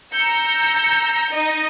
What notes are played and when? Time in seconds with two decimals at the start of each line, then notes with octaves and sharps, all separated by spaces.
0.14 A#5 E6 G6 C#7
1.31 D#4 D#5